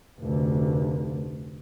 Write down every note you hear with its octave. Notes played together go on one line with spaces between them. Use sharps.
F1 D2